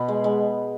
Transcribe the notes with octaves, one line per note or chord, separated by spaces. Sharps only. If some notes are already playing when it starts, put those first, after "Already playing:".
Already playing: B2 B3
G#3
G#3